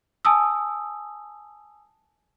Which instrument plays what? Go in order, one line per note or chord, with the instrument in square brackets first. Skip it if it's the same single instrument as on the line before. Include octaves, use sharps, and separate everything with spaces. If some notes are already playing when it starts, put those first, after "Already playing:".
[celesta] G#5 A5 D#6 E6